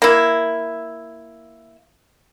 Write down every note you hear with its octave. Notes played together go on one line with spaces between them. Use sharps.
A#3 E4